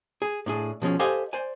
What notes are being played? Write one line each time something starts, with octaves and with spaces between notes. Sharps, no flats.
G#4
A2 D4 G#4
B2 F3 C#4 G#4
G4 A4 C5 D#5 F5 G#5
C5 D5 G#5